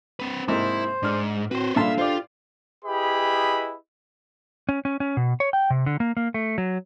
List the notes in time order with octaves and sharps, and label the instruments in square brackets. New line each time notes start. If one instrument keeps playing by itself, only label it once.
[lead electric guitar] C4 B4
[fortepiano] G#2 C3 A#3 [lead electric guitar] E4 [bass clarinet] C5
[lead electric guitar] G#2 [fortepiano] D4 F6
[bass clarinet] A2 [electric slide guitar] C4 F#4 [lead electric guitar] B4 C5
[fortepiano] A#2 A5 C6 [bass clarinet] G3 [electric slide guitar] D4 A4 F5 [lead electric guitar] E5
[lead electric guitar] F4 [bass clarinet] G4 [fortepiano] C5 D5
[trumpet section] E4 G4 G#4 B4 D#5 B5
[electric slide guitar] C#4
C#4
C#4
B2
C#5
G5
C3
D3
A#3
A#3
A3
F#3